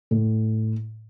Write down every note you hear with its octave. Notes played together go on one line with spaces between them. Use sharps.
A2